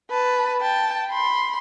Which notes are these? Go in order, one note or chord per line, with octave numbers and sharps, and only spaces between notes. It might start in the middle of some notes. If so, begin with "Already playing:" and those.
B4 A5
G5 A5
B5 C6